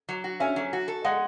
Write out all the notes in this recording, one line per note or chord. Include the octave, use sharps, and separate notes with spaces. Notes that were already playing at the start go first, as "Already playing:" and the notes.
F#3
F#4
C#4 E5 G#5
F#3
F#4
A4
G#3 D#5 F#5